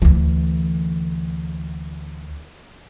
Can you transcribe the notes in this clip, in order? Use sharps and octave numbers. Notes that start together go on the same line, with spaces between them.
D2 E3